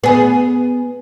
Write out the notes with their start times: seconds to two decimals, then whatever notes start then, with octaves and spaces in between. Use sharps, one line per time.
0.04 B3 G#4